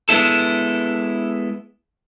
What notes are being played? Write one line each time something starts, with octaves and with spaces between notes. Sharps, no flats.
G#3 B3 E4 A4